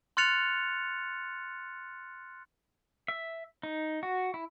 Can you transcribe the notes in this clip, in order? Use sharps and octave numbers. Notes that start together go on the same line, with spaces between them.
C6 F6 F#6 A6 C#7 F7
E5
D#4
F#4
E4